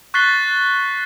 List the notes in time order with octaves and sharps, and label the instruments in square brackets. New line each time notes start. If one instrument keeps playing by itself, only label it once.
[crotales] C#6 F#6 A6 B6 C7 G7